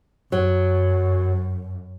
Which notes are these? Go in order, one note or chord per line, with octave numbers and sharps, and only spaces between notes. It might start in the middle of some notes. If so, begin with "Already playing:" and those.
F#2 F#3